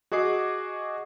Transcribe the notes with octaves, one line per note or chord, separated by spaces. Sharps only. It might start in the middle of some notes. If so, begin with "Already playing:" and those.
F#4 G#4 D#5 D6 C7